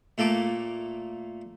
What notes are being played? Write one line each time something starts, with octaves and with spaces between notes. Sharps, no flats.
A#2 A3 A#3 D6